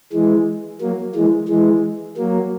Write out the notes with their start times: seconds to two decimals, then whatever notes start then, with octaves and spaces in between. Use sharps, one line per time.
0.13 E3 G#3
0.81 F#3 A#3
1.15 E3 G#3
1.49 E3 G#3
2.17 F#3 A#3